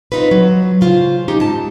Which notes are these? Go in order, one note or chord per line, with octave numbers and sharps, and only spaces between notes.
C4 D#4 F4 B4
F#3
C#3 F4 C5 F5
C#4 D#4 G4
G#2 A5